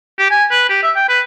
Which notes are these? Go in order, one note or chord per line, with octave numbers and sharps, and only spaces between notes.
G4
G#5
B4
G4
E5
G5
B4